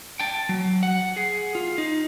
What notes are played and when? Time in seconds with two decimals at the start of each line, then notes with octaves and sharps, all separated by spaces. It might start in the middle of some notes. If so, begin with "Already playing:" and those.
0.20 G5 A5
0.49 F#3
0.83 F#5
1.16 G#4
1.55 F4
1.78 D#4